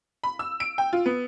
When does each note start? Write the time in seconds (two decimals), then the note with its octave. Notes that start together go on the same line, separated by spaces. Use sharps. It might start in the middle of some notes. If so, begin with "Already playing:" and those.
0.23 B5
0.39 E6
0.60 D7
0.78 G5
0.93 F4
1.06 B3